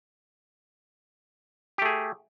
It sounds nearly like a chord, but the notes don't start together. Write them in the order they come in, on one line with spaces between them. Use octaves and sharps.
G4 A3 G#4